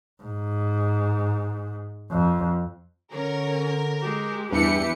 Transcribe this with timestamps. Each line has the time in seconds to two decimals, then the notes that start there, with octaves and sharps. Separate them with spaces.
0.23 G#2
2.11 F2
3.12 D3 C#4 A#4 C#5
4.01 G#3 G4
4.52 E2 G2 E3 G4 B4 C#7